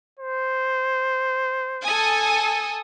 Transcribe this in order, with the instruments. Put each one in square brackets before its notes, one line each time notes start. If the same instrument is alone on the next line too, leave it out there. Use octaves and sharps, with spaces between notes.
[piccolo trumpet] C5
[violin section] A4 G#5 D#6